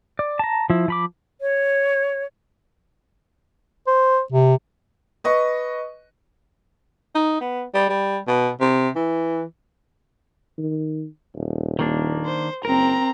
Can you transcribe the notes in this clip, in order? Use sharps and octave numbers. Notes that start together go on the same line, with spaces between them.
D5
A5 A#5
F3 E4
F3 B5 D6
C#5
C5
C3
B4 D#5 C#6
D#4
B3
G3
G3
B2
C3
E3
D#3
D#1
D#3 A#3 D4
C5
F#1 C4 A#4 A#5